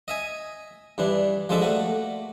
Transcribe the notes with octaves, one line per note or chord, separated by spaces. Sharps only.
D#5 E5 G#5
G2 E3 D4
F3 G#3 D4 A4 E5
A3 A#3 F#4